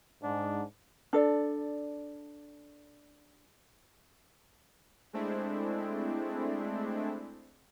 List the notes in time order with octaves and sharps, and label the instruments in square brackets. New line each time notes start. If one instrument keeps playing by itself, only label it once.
[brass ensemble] G#2 [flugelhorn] D4
[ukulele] D4 A4 D5
[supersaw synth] G#3 A3 C4 D4 E4